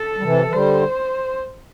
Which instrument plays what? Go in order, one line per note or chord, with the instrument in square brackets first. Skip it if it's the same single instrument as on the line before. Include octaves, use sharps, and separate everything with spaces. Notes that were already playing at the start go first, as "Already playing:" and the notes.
Already playing: [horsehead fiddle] A4
[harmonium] G3
C3 E3
E3
[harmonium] D3 G3 [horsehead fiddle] C5